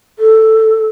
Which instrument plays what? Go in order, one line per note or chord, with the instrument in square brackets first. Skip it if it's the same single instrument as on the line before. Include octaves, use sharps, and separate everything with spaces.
[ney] A4